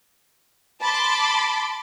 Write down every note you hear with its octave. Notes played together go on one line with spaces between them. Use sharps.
A5 B5 C6 D6